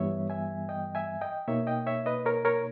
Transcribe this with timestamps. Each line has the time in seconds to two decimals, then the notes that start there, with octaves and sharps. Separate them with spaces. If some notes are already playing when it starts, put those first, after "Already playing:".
Already playing: G2 E3 G3 B3 C#5 E5
0.30 E5 G#5
0.69 D#5 G5
0.95 E5 G#5
1.21 D#5 G5
1.48 B2 A#3 D#4 C#5 E5
1.67 D#5 G5
1.87 C#5 E5
2.06 B4 D#5
2.26 A#4 C#5
2.45 A#4 C#5